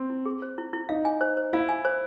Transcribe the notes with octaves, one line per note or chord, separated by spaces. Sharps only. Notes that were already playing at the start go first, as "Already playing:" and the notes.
Already playing: C4
E4
G#4
C5
E4
E4
D#4 F5
G#5
C5
C5
E4 F5
G#5
C5